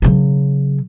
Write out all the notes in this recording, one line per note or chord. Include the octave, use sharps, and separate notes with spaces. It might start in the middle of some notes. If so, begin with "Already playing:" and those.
C#3 F#3